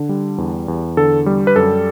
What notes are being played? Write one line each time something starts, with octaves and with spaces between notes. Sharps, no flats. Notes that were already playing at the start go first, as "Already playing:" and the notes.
Already playing: D3
G3
E2
E2
D3 A4
G3
B4
F#2 A4